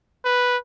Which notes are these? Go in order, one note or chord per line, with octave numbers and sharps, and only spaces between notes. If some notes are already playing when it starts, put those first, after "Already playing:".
B4